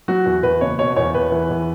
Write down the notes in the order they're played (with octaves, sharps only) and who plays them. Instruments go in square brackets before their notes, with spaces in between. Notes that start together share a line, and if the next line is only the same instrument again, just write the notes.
[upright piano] F#3 F#4
E2
E2 B4
F#1 C#5
B2 C#5
E2 C#5
E2 B4
E3
E2